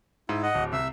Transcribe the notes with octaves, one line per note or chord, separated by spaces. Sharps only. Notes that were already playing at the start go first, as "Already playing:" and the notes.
G#2 E4
D#5 F#5
D1
C2 E5 E6